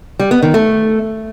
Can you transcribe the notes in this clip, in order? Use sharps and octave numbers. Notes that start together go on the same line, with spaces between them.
G3
B3
D#3
A3